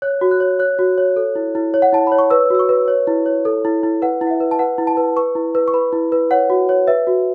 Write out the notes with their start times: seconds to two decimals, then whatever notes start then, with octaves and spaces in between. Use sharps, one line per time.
0.02 C#5 F#6
0.21 F#4
0.31 F#6
0.40 C#5
0.59 C#5 F#6
0.79 F#4
0.98 C#5
1.16 A4
1.35 E4
1.55 E4
1.74 C#5
1.82 F#5
1.92 E4 A5
2.07 C#5 B5
2.19 C#6
2.30 B4 E6
2.50 F#4 E6
2.59 C#6
2.69 B4
2.88 C#5
3.07 E4
3.26 C#5
3.45 A4
3.65 E4
3.83 E4
4.02 B4 F#5
4.21 E4
4.27 F#5
4.30 E5
4.40 B4
4.51 A5
4.59 B4 F#5
4.78 E4
4.87 A5
4.97 B4
5.16 B4 C#6
5.35 E4
5.55 B4
5.68 C#6
5.74 B4 B5
5.93 E4
6.12 B4
6.31 C#5 F#5
6.50 F#4
6.69 C#5
6.88 B4 E5
7.07 F#4